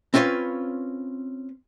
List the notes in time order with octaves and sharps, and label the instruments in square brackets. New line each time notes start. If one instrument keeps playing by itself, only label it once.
[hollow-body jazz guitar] C4 C#4 F4 B4 C#5